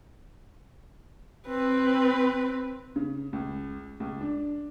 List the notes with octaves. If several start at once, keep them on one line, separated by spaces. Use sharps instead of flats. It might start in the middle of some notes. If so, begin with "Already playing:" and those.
C4 B4
C#3
C#2
C#2
D4